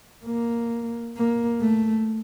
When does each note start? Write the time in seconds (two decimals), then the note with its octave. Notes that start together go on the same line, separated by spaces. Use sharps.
0.25 A#3
1.16 A#3
1.61 A3